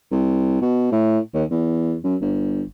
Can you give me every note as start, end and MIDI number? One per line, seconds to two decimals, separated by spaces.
0.11 0.60 36
0.62 0.91 47
0.92 1.19 45
1.34 1.44 39
1.51 1.96 40
2.04 2.16 42
2.21 2.63 31